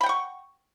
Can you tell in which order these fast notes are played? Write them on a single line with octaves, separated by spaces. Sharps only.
B5 G5 F#5 C#6